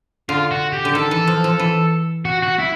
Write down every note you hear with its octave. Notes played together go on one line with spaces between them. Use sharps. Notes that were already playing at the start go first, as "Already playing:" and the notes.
D3 F4
F#4
G4
D3
D#3 A4
E3
F3
F3
E3
F#4
F#4
E4